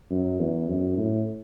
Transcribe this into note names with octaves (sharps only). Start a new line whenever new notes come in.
F#2
E2
F#2
A2